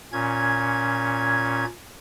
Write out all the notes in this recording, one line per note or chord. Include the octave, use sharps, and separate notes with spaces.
A#2 C#4 G#6